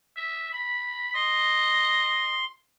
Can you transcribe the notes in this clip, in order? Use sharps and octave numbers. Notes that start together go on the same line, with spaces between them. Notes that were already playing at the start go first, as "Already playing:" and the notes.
E5
B5
D#5 C6